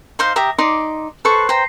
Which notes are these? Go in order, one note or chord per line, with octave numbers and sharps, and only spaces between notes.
D#4 C5 F5
G4 E5 A#5 D#6
D#4 D5 C6 D6
A4 B4 C5 C#6
C5 G5 A#5